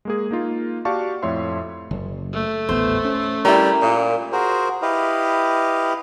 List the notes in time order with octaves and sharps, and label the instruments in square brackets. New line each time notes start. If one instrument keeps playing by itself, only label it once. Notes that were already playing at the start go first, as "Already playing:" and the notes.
[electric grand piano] G#3 A#3 G#4
A#3 D#4 F4
F#4 G4 D5 F5 A5 C#6
F2 A2 C#5 E5 C6
[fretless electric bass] F#1
[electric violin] A3
[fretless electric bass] D#1 A1 B3 [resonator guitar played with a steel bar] C5
[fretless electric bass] C#4
[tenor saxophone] G3 [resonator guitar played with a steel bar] E4 G4 A#4
[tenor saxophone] A#2
[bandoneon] F#4 G#4 A#4 C5
E4 G4 B4 D#5 F5